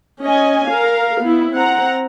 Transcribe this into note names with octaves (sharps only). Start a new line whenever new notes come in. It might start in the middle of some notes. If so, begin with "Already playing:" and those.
C#4 D#5 G#5
A#4 F5
B3 E4
C4 F#5 A#5